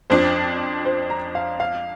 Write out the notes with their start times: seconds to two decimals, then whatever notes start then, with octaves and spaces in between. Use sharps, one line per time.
0.10 F2 F3 D4 C5
0.85 C5
1.10 A#5
1.35 F5
1.60 F5